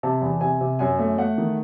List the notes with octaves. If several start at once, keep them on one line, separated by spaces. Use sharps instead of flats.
C3 A5
E2
C3 G#5
C3
F#2 G#5
A3
A3 F#5
D#3